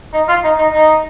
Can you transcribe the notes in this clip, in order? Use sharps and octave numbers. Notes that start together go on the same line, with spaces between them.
D#4
F4
D#4
D#4
D#4